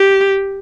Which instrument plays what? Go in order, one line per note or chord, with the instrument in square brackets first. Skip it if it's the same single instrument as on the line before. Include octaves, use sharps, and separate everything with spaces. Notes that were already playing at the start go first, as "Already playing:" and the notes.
Already playing: [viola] G4